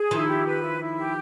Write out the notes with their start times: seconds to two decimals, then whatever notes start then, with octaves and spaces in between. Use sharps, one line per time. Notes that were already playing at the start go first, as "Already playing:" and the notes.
Already playing: G#4
0.11 D#3 F3 E4
0.28 G4
0.45 B4
0.62 E4
0.80 E4
0.97 G4